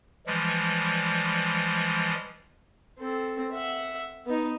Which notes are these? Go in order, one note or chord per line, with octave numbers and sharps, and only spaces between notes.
E3 F3 G3 G#3
C4 A4
E5 F#5
B3 D#4